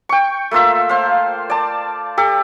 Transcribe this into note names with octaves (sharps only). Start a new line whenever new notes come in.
G5 C#6
A3 A#3 F4 E5
C5 F5
D5 A5
G4 A4